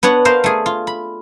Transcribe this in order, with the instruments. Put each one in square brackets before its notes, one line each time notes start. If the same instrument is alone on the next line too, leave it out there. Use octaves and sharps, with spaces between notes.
[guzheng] B3 D4 C#5 F#5
A#4 C5 F5
A3 G#4
F4
B5